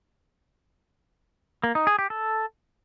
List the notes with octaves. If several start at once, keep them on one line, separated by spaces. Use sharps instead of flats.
A#3
D#4
G#4
G4
A4